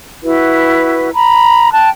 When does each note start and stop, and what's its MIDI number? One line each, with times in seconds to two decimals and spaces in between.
0.23 1.08 64
0.23 1.08 66
0.23 1.08 71
1.13 1.72 82
1.13 1.72 83
1.72 1.90 79
1.72 1.90 81
1.72 1.90 90